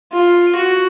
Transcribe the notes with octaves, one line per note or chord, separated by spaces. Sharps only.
F4
F#4